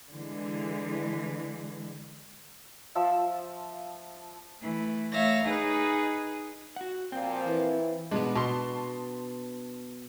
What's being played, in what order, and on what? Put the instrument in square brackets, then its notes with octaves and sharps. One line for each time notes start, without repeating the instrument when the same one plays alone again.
[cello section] D3 E3 G#3
[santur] F3 E5 E6
[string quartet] E3 A3
A3 C#5 E5 F5 A#6
D#4 G#4 B4
[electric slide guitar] F#4 F#5
[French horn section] A#2 F3 [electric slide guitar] C4 G5
[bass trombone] E3
[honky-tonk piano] B2 G#3 [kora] B3 D4
[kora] B2 [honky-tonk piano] A5 C6